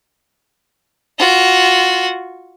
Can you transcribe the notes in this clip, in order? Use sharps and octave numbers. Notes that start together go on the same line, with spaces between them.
F4 F#4